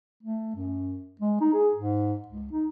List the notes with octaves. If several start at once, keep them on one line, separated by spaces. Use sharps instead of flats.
A3
F#2
G#3
D#4
G#4
G#2
C#2
D#4